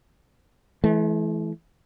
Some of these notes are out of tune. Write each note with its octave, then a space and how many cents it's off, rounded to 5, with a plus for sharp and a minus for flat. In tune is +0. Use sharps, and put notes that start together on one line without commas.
E3 +0 A3 -45